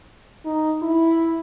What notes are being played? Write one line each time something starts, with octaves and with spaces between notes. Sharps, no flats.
D#4
E4